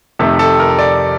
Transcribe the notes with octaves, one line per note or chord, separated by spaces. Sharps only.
F2 C3 D#3 A3 A4
A4
A#4
D5